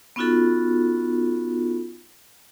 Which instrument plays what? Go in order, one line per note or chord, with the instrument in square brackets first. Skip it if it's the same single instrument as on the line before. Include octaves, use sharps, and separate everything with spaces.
[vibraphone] B3 C#4 D#4 F4 F#4 A4